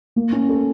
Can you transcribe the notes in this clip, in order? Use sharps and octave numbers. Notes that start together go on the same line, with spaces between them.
A#3
C#4
A4